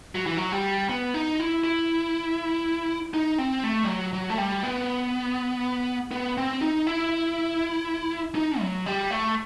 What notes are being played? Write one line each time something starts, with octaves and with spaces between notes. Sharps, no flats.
F#3
E3
F#3
G3
B3
D#4
E4
E4
D#4
C4
A3
G3
F#3
F#3
A3
G3
B3
B3
C4
D#4
E4
D#4
F#3
G3
A3